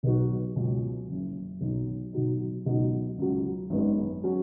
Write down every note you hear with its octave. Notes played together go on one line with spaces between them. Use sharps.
B1 B2 B3 D#4 F#4
C#2 B2 F#3 C#4
F#1 F#2 C#3
B1 B2 F#3 D#4 F#4
B2 F#3 D#4
C#2 B2 F#3 D#4
C#2 C#3 F#3
G#1 F#2 D#3 G#3 B3
F#3 C#4